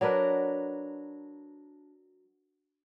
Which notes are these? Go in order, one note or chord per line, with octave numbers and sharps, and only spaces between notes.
F#3 D4 A#4 B4